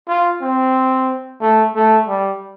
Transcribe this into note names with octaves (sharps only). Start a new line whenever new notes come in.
F4
C4
A3
A3
G3